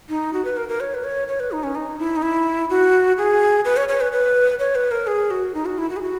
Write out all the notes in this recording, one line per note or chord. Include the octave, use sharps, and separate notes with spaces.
D#4
F#4
B4
A#4
A#4
C#5
B4
C#5
C#5
B4
D#4
C#4
D#4
E4
D#4
E4
F#4
G#4
B4
C#5
C#5
B4
B4
C#5
B4
A#4
G#4
F#4
D#4
F#4
E4
F#4
G#4
F#4